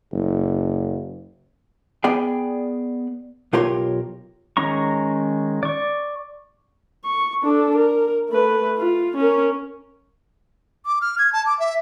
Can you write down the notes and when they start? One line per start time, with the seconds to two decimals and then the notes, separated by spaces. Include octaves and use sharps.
0.12 F#1
2.04 B3 G#4 D5 G5
3.53 B1 F4 G4 A#4 C#5 C6
4.57 D#3 G#3 C#4 A#5 C#6
5.63 D5 C#6
7.05 C#6
7.43 D4 A4
7.76 A#4
8.30 A3 B4
8.78 F4
9.17 C#4 A#4
10.86 D6
11.01 F6
11.18 G#6
11.33 A5
11.46 D6
11.59 E5